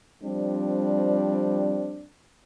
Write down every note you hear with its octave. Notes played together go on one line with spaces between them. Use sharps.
F3 G3 C4 D4 D5